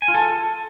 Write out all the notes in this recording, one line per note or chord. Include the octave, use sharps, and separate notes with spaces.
G#5
F4
A4